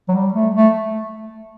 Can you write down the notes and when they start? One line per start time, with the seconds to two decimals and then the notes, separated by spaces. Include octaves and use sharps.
0.09 F#3
0.12 G3
0.34 A3
0.55 A3